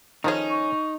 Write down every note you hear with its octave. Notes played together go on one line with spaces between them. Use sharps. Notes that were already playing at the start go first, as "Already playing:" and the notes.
D#3 F3 A3 C#4 D#4 G#4
C#6